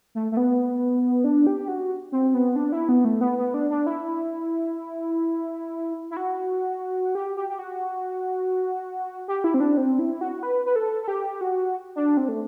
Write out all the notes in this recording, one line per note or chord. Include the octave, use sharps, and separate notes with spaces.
A3
A3
B3
D4
G4
F#4
C4
B3
D4
E4
B3
A3
B3
B3
D4
D4
E4
E4
F#4
G4
G4
G4
F#4
G4
E4
C4
D4
C4
E4
F#4
B4
B4
A4
A4
G4
F#4
D4
C4
A3